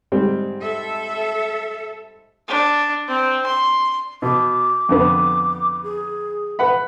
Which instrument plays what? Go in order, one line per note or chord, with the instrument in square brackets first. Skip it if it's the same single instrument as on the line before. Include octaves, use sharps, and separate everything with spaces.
[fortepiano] G#2 G3 C4
[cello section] A4 E5
[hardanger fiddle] D4
C4
C6
[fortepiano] B2 [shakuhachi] D6
[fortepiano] F2 D3 B3
[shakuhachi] G#4
[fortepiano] B4 F#5 B5